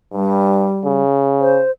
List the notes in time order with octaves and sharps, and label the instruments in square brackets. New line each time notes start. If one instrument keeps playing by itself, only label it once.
[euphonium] G2 [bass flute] G3
[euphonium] C#3
[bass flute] C5